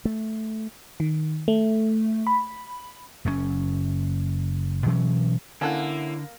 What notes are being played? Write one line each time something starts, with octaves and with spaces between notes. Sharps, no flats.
A3
D#3
A3
B5
F#1 F#2 A#2 C#4
B2 E3 F#3 C#4
D3 A#3 C#4 E4 A4 F#5